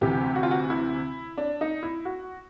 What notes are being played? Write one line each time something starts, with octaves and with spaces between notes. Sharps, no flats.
D2 C3 E3 G4
F#4
F4
F#4
E4
D4
D#4
E4
F#4